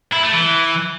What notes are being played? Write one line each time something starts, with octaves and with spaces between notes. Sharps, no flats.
E4
A3
E3